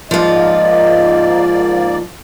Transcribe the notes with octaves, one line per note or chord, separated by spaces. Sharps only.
G#2 F3 A#3 F4 D5 D#5